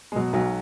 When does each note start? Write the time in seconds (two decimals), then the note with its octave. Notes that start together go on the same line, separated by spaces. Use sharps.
0.12 G#3
0.15 B2 F#3
0.33 B1 F#3